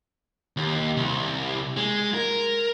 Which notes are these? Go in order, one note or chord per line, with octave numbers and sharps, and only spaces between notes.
D#2
C2
G#3
A#4